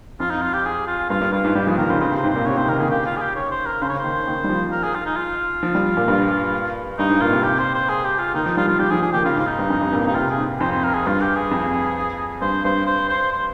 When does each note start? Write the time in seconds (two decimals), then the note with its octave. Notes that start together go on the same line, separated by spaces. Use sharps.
0.20 F2 F4
0.31 D#4
0.42 F4
0.54 G4
0.65 G#4
0.88 F4
1.10 G2 F4
1.21 G2
1.32 G2 F4
1.44 G#2
1.55 G3 G4
1.67 F3 G#4
1.78 D#3 A#4
1.90 C#3 C5
2.01 C#3 C5
2.12 C3
2.16 C5
2.24 G#2
2.30 A#2 C5
2.46 C3 C#5
2.57 C3 C5
2.68 D#3 A#4
2.79 D#3 G#4
2.91 C#3 G4
3.06 F4
3.17 G#4
3.21 G4
3.36 C#5
3.51 C5
3.66 A#4
3.82 C#3 C5
3.90 C#5
3.99 C5
4.04 D#3
4.27 D#3
4.44 G3
4.49 F3
4.72 A#4
4.84 G#4
4.95 F4
5.06 D#4
5.17 F4
5.63 F3
5.75 G3
5.97 A#2
6.08 G2
6.99 G2 D#4
7.09 G#2
7.21 A#2 F4
7.33 C3
7.44 G4
7.59 C5
7.75 C5
7.89 G#4
8.04 G4
8.19 F4
8.34 D#3 D#4
8.46 F3
8.57 G3 F4
8.68 F3 F4
8.79 G3 G4
8.90 F3 G#4
9.02 F3 G#4
9.13 D#3 G4
9.25 C#3 F4
9.36 G#2
9.40 F4
9.47 D#4
9.59 G2
9.70 F2
9.81 G2
9.93 A#2
10.05 C3
10.08 D#4
10.15 C3 F4
10.31 G#4
10.38 G#2
10.60 F2 C5
10.72 C5
10.84 A#4
10.95 G#4
11.07 G2 F4
11.21 G4
11.36 G#4
11.51 F2
12.42 G2 C5
12.65 G2 C5
12.87 C5
13.10 C5
13.32 C5